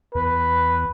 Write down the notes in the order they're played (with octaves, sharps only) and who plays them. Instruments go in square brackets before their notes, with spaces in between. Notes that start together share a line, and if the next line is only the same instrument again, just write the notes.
[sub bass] E2 [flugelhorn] B4